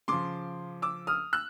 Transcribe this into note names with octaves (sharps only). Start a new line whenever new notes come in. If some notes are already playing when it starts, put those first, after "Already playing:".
C#3 F3 C6 D6
D6 E6
D#6 F6
E6 F#6